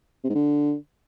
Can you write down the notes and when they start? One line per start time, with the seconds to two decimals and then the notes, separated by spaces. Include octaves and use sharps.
0.24 C3
0.29 G#2
0.35 D3